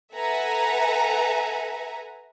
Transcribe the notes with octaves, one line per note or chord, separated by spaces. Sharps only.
A4 B4 E5 F#5 G#5 A#5